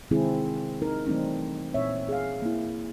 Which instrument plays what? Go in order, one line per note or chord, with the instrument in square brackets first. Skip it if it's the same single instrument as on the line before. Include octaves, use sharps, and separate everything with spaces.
[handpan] C3 D#3 G#3 C4 E4 G#4
C4 D#4 A#4
E3 G3 A3 C4 D4 D#4
A#2 C4 C#5 E5
G#4 F5
A#3 E4